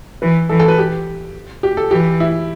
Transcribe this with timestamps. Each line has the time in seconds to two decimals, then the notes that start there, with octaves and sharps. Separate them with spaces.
0.22 E3 B4
0.49 E3 A4
0.59 A4
0.68 B4
0.78 G4
1.63 G4
1.77 A4
1.91 E3 G4
2.20 E4